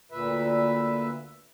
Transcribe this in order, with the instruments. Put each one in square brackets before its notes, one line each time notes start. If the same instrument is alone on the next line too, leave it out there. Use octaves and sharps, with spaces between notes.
[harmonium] D2 A#2 B4 E5